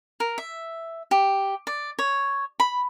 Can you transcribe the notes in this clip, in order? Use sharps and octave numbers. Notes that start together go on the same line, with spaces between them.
A#4
E5
G4
D5
C#5
B5